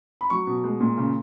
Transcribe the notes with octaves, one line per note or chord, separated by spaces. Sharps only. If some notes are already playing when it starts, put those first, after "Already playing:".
B5
F#3 C#6
B2
G#3
A#2
C#3